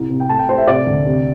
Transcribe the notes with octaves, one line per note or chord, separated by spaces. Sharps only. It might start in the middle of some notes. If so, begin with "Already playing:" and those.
Already playing: C2
C3
G5
A3 A5
G5
A3 C5
E5
C3 D5
D2
C3